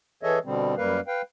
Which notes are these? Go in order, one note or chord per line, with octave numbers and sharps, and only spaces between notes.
E3 G#4 A4 C#5 D#5 E5
B2 D3 G3 C4
F#2 G3 A#3 A#4 B4 F5
B4 F5 G5